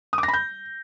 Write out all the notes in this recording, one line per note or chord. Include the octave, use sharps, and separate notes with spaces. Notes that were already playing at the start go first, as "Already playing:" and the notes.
D#6
D6
A#6
B5
G6